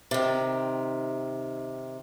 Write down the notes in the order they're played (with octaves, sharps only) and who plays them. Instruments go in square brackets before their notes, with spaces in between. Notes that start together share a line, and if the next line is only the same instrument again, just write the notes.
[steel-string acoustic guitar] C3 D#3